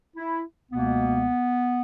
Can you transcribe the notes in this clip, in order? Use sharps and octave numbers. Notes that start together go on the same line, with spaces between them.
E4
C#2 B2 A#3 B3